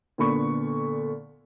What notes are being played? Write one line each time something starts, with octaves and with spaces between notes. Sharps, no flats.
A#2 D3 B3 B5 C#6